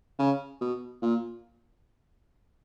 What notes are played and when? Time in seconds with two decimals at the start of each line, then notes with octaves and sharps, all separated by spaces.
0.19 C#3
0.61 B2
1.02 A#2